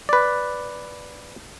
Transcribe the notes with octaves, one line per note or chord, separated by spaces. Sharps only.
B4 D5